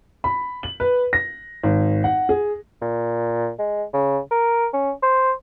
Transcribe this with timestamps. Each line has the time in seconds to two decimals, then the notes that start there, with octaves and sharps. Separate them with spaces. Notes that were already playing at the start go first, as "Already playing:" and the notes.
0.24 B5
0.63 F#7
0.80 B4
1.13 A#6
1.63 G#1
2.04 F#5
2.29 G#4
2.82 A#2
3.59 G#3
3.93 C#3
4.31 A#4
4.73 C#4
5.03 C5